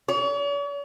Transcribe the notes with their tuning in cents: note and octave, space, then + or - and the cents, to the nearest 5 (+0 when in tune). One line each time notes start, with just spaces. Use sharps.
C#5 +45